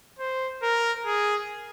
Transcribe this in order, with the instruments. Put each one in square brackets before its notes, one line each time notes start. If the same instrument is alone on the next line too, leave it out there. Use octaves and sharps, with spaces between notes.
[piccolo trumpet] C5
A#4
G#4